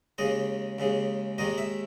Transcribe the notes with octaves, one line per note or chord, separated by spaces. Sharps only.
D#2 C#3 G#3 D#5
D#2 C#3 G#3
D#2 D#3 G#3 D#5
E5